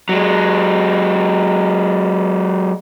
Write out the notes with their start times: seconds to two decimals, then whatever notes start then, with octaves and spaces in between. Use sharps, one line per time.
0.09 F#3 G#3